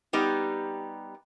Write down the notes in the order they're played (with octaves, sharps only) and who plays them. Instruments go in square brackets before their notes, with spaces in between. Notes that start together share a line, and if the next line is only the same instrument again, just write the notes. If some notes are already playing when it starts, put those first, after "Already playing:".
[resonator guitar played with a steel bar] G3 B3 D#4 G4